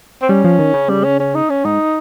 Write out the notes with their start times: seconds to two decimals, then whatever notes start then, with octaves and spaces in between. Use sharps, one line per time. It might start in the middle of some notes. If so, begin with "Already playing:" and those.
0.22 C4
0.29 G3 C#4
0.44 F3
0.59 D#3
0.74 C#3
0.89 G3
1.04 C#4
1.20 C#4
1.35 D#4
1.50 C#4
1.65 G#2 D#4